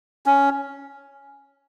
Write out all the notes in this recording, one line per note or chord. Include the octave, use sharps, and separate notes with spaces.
C#4